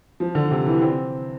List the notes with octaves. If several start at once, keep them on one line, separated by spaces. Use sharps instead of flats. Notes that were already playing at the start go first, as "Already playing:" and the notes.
F3
D3
C3
E3
C4